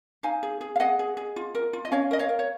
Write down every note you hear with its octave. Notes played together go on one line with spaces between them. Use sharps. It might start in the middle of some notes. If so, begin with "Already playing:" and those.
D#4 F5 G#5
G#4
G#4
F5
G#4 D#5 F#5
G#4
G#4
F4
A#4
F4
D#5
C#4 C#5 F5
A#4 D#5
C#5 F5
A#4
C#5